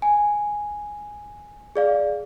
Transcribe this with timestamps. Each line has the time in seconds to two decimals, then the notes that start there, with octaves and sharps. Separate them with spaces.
0.02 G#5
1.76 G#4 D5 F5